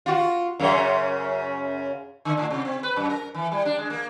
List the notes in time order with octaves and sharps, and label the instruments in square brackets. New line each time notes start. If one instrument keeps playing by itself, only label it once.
[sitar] F4 F#4
F#2 C#3
D3
A2
C3
C4
B4
F#2
A#4
E3
G3
D4
G#3
A#3